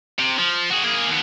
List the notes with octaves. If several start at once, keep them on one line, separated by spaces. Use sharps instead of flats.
C3
F3
F#4 G#4
A#3 G#4
D#2 B3